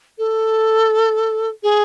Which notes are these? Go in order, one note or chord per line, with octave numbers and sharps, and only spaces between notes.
A4
G#4